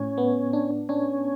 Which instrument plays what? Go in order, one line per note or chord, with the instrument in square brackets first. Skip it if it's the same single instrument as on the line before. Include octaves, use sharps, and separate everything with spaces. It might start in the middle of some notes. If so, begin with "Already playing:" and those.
Already playing: [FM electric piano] A2 [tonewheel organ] C#4
[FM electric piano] B3
D4
[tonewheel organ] C#4 [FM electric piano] D4